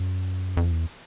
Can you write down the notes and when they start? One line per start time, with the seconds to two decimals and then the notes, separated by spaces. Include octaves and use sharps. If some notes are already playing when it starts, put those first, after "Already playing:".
Already playing: F#2
0.57 F2
0.72 E2